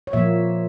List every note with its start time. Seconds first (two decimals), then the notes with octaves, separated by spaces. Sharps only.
0.07 C#5
0.13 A#2 F3 A#3 E5